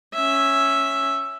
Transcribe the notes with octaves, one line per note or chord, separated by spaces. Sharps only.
C#4 E5